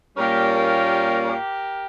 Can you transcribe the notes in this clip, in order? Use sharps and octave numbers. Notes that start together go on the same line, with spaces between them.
A#2 G3 A#3 C#4 G4 A#4
G4 A#4
G4 A#4